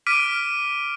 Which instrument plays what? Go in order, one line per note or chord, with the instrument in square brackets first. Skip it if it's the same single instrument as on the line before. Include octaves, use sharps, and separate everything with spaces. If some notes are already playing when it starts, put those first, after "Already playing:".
[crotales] D6 F6 B6 D7 D#7